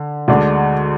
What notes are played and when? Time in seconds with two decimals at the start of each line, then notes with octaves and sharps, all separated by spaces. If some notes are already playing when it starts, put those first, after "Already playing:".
Already playing: D3
0.28 D2 D3 G#3 D4